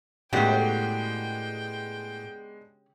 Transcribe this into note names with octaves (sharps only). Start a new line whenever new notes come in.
A2 C#3 G#3 B3 D4 F#4 G4 G5